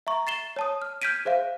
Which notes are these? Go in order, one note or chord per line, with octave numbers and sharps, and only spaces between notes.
E5 A#5 C#6
A6 C7 E7 G7
C#5 A5 D#6
F6
F6 G6 G#6 B6 D7 D#7
G#4 C5 E5 F5